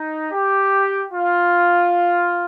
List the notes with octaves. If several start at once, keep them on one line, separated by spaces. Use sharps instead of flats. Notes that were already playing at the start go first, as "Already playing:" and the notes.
Already playing: D#4
G4
F4